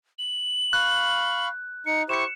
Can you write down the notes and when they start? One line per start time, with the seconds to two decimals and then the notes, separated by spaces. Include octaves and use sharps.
0.19 F#7
0.73 F5 B5 C#6 F#6
1.86 D#4 C#7
2.09 E4 G4 C5 C#6 C#7 E7